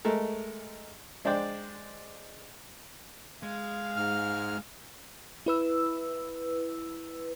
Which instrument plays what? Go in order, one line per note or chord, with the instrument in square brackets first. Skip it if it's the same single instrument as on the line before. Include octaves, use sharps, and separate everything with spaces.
[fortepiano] G#3 A3 A4 A#4
G#3 D4 C5 D5 G5
[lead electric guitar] G#3 [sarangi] F5
[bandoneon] G#2 F6
[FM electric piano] E4 B4 E6